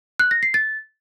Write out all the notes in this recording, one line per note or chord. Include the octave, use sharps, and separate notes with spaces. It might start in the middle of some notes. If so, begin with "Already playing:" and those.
F#6
A#6
C7
A6